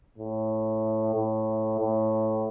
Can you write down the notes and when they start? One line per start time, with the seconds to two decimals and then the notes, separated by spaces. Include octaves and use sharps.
0.18 A2
1.15 A2
1.80 A2